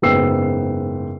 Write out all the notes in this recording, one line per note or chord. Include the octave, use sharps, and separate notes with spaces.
F#1 G#2 B3 G5 E6 C7